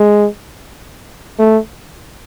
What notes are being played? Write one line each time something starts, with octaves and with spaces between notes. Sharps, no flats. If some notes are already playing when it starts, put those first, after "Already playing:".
Already playing: G#3
A3